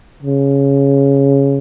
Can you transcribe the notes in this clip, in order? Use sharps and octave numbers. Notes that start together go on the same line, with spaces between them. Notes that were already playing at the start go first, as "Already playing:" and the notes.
C#3